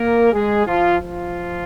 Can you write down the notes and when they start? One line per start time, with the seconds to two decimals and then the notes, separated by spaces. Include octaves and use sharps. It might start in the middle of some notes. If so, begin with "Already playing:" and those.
Already playing: A#3 A#4
0.32 G#3 G#4
0.66 F3 F4
1.00 F3 F4